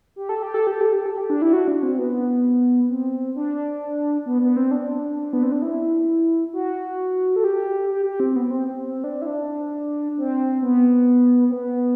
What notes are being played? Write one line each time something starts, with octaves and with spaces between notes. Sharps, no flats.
G4
A4
G4
A4
G4
A4
G4
A4
G4
D4
E4
F#4
D4
C4
B3
C4
D4
B3
B3
C4
D4
B3
C4
D4
E4
F#4
A4
G4
G4
G4
C4
B3
B3
C4
C4
D4
E4
D4
C4
B3
C4
B3